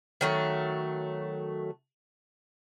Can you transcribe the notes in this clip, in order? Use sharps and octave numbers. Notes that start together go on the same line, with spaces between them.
D#3 F#3 A3